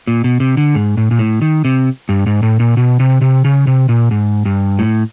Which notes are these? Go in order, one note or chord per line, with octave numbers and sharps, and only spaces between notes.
A#2
B2
C3
D3
G#2
A2
A#2
A2
D#3
C3
G2
G#2
A2
A#2
B2
C3
C3
C#3
C3
A#2
G#2
G2
A2